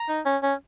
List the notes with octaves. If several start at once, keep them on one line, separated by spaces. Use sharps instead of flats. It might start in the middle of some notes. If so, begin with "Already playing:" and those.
Already playing: A#5
D#4
C#4
C#4